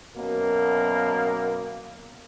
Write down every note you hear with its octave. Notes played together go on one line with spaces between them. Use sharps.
F#2 B2 A#3